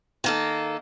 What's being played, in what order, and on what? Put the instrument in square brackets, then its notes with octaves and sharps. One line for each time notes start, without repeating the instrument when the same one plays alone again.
[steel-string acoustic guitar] D#3 A#3 A4